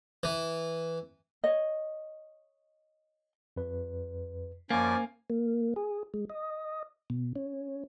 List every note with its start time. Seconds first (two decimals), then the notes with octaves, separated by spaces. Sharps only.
0.23 E3
1.44 C#5 D#5
3.56 F2 B4
4.70 F#2 F3 A#3 D5 G#5
5.30 A#3
5.76 G#4
6.14 G#3
6.30 D#5
7.10 B2
7.36 C#4